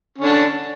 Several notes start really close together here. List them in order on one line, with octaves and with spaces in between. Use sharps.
C#4 D3 D4